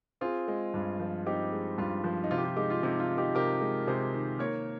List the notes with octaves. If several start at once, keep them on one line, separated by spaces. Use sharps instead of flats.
C4 F4 G#4
G#3
G2
F3
C4 D#4 G4
G#3
G2 F4
F3
D#4
C3 F4
G4
F4
G#3 D#4 G4
F4
C3 D#4
F4
D#3
D#4 G4
C3 G4 A#4
G#3
C3 G#4 C5
D#3
A#3 A#4 C#5